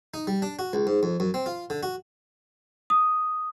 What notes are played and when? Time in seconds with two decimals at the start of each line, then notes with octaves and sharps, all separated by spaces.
0.14 D#4
0.27 G3
0.42 D4
0.59 F#4
0.73 C#2
0.87 G#2
1.03 F2
1.20 F#2
1.34 C4
1.46 F4
1.70 D3
1.83 F#4
2.90 D#6